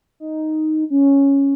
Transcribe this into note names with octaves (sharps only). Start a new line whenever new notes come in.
D#4
C#4